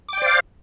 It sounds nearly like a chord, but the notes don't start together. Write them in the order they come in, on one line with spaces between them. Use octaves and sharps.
D6 G5 D5 C5 F5